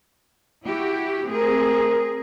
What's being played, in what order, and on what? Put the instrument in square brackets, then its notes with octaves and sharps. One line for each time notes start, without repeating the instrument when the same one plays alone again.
[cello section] E4 F#4 G4
[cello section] A3 C4 G#4 [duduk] A#4